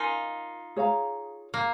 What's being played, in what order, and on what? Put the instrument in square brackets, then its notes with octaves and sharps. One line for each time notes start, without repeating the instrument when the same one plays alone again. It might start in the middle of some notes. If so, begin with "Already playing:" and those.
Already playing: [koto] D#4 F4 [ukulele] A#4 F5 G#5
[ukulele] G#4 C#5 F5 A#5
[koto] A#3